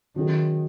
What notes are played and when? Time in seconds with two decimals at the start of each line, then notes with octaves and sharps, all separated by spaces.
0.16 D#3 F#3 C#4 E4 G#4